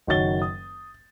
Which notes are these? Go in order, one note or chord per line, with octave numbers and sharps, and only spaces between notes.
F#1 D#3 F#4 C#5 A6 G7
D#6